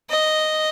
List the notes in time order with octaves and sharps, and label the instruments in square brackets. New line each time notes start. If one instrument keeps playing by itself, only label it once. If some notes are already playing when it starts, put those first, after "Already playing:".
[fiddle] D#5